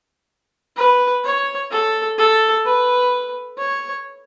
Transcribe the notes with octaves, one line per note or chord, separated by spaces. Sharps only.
B4
C#5
A4
A4
B4
C#5